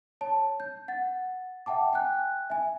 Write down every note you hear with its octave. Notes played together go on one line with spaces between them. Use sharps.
C#5 A5
G6
F#5 A6
E5 F#5 G5 A5 D6
G5 G#5 F#6
E5 G#5